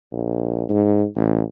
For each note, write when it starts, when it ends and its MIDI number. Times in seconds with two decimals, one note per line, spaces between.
0.12 0.64 34
0.69 1.06 44
1.16 1.42 33